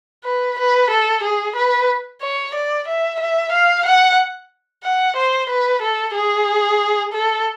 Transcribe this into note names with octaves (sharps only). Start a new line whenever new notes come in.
B4
B4
A4
G#4
B4
C#5
D5
E5
E5
F5
F#5
F#5
C5
B4
A4
G#4
A4